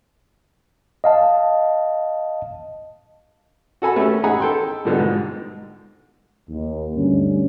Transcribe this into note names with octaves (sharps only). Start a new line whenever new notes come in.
D#5 F5 A5
F#4 A4 G#5 B5
A3 C#4 G4 A4
D#4 G#4 F#5 G#5 A#5 B5
A4 G5 C6
B2 D3 F3 G3
G#2
D#2
D2 G2 C#4